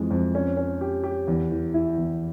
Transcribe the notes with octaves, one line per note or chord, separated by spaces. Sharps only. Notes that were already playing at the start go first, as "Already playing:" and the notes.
Already playing: F2 E3 G#3
F2
C#4
C#4
G4
G4
E2
E3
E4
E2